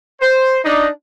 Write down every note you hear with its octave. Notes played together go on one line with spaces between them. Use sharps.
C5
D4 D#4